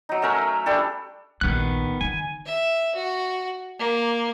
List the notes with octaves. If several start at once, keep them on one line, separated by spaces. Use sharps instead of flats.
F#3 D#4
A3 C#4 A#4 E5
G3 D4 G4 A4
A#1 D#2 D#3 B3 F#6
D#3 G#5
E5
F#4
A#3